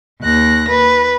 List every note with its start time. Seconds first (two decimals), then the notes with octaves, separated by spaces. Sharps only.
0.23 D#2 F#6 A#6
0.70 B4